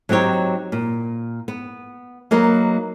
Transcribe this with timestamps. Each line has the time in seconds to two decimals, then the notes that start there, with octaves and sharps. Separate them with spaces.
0.09 F#3 C4 D#4 G4 C#5
0.72 A#2
1.48 B3
2.31 F#3 A#3 D#4 B4